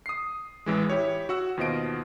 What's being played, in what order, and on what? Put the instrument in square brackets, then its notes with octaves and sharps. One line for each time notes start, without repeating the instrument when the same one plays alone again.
[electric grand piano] D#6 C7
A1 E3 G#3
E4 G4 C#5
F#4 F#5 E6
D#2 B2 F4 C5 D#5 D7